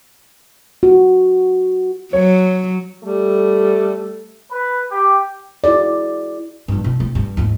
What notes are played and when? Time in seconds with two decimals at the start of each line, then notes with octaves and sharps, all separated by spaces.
0.83 F#4
2.13 F#3 C#5
3.03 G3 A3 A4
4.51 B4
4.90 G4
5.64 E4 F#4 G#4 D5
6.68 G2 F#3
6.84 B2
7.00 C4
7.15 G2
7.37 D#2 G#2